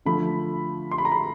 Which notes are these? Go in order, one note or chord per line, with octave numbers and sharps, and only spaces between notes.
D3 F3 A3 B5
C6
B5
A#5
B5